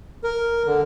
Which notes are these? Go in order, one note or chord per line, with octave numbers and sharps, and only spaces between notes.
A#4
D3